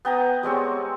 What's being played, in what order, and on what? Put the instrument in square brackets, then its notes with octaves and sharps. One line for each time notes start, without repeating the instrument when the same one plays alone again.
[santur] B3 G5 A#5 D#6
G3 G#3 C4 C#5